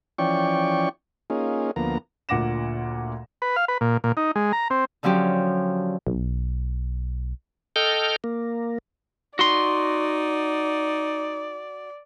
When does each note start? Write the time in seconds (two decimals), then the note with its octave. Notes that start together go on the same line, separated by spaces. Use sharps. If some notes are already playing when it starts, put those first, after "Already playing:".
0.18 E3 F3 C#4 D5 G5 C#6
1.30 A#3 C#4 D#4 F4 G#4
1.76 D2 F3 A#3 B3 A#5
2.29 D2 A#2 F#5 D6 A#6 E7
3.42 B4
3.56 F5
3.68 B4
3.81 A#2
4.04 A#2
4.17 D#4
4.36 G#3
4.53 A#5
4.70 C4
5.03 D3 F3 F#3 C#4 G4
6.07 B1
7.76 A4 D#5 G5 F6 G6
8.24 A#3
9.39 D#4 F#4 D5 C6